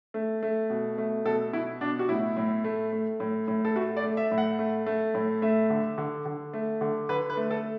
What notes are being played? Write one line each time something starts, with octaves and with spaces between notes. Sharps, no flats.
A3
A3
B2
A3
B2 A4
B2 E4
B2 D4
F#4
A2 E4
A2
A3
A3
A2
A2
A4
A3 F#4
D5
A3
E5
A2
F#5
A3
A3
A2
A3 E5
D3
D3
D3
A3
D3
D3 B4
B4
A3
A4